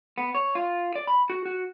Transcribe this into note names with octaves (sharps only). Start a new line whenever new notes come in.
B3
C#5
F4
D5
B5
F#4
F#4